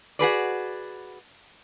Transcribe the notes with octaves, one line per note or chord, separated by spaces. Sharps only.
F#4 G#4 B4 D5